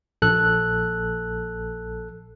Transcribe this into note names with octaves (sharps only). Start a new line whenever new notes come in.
A#1 A4 F#6